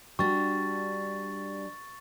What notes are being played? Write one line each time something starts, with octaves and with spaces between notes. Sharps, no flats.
G3 D4 F#4 C#6 A6